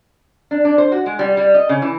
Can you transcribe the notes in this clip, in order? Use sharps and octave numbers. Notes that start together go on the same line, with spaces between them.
D4
D4
C5
F#4
G#3
G3
G3
D#5
C#3
E3